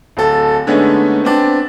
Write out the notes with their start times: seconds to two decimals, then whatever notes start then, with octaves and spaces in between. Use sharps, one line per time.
0.17 D1 A4
0.67 D3 G#3 A3 B3 C#4 D#4
1.23 B3 C4 D4